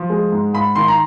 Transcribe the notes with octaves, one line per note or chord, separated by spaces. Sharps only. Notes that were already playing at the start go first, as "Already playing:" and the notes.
Already playing: F3
G#3
G#2
G#2 B5
D#3 C6
A#5